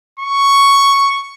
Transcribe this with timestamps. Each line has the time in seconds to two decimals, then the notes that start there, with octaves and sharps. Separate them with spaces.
0.19 C#6